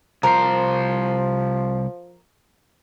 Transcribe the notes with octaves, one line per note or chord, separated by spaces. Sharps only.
C2 F3 A#4 C5